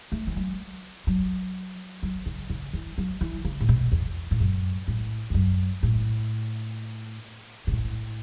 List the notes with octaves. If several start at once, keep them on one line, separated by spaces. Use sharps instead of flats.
A3
E3
F#3
F#3
F#3
C#3
C#3
E3
F#3
E3
C#3
A2
B2
E2
A2
F#2
A2
E2
F#2
A2
B2
A2